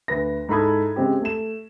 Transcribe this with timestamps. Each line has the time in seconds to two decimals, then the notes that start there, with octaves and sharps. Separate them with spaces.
0.08 D2 B4 A#6
0.49 G#2 E4 A4 B5 D#6 G#6
0.96 C#3 G#3 C4 G4
1.22 A3 E7